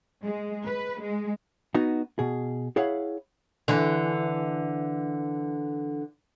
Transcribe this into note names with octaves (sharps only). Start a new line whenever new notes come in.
G#3
B4
G#3
B3 D#4 F#4
B2 G#4
E4 G#4 C#5 F5 F#5
D3 E3